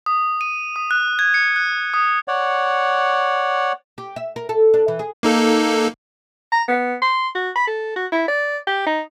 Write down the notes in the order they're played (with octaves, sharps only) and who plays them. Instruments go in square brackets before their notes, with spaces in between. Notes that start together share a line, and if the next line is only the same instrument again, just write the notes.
[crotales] D#6
D#7
D#6
F#6
G#6
C#7
F#6
D#6
[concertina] C#5 D5 F#5
[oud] G4
E5
A#4
A4
D4
E3
G#4
[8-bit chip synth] A#3 D#4 A4
[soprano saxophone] A#5
B3
C6
F#4
B5
A4
F#4
E4
D5
G4
D#4